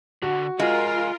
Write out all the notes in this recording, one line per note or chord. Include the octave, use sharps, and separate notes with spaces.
D3 F#4
G#3 F4 A#4 F5 G#5